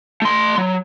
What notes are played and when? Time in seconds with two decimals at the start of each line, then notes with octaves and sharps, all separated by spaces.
0.22 A3 C6
0.58 F#3